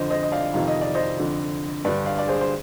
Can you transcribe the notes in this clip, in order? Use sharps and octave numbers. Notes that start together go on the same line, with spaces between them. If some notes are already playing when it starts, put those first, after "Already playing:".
Already playing: F2 D3 C5 D#5
C5 D#5
D#5
D5 F5
F2 C3 D#3 F5
D#5
D5
C5 D#5
F2 D3
G2 D3 B4 D5
D5 F5
D5
G#4 C5
C5